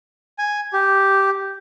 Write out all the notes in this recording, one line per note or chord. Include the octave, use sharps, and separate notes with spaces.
G#5
G4